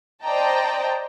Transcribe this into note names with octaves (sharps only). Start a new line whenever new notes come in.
C5 D5 D#5 G5 A5 A#5